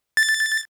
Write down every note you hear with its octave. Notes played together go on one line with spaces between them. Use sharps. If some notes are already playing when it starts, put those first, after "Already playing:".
A6